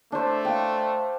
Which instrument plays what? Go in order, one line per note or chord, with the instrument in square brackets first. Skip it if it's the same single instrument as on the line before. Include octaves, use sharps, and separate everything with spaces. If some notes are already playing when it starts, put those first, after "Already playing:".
[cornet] A3 [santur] D4 C5
[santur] F5 G5